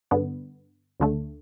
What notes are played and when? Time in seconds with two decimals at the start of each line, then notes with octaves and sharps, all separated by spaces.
0.11 G2 D3 B3
1.00 D2 D3 A3